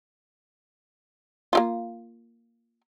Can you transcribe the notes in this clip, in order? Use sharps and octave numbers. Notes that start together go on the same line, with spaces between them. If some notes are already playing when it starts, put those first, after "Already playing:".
A#3 E4 F4